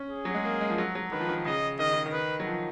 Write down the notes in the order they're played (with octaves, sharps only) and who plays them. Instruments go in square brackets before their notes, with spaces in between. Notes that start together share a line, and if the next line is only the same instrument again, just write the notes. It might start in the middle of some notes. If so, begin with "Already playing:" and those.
Already playing: [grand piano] C#4
[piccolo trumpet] G#4
[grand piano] F#3
G#3
A#3
G#3
F3
F#3
F#3
[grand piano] D#3 [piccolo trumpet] B4
[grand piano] F3
D#3
[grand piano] C#3 [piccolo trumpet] D#5
[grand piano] D#3 [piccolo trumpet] D#5
[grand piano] C#3
D#3
[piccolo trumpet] B4
[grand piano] F#3
F3